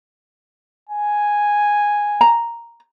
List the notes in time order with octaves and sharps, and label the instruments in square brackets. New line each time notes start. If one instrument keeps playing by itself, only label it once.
[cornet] G#5
[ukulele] A#5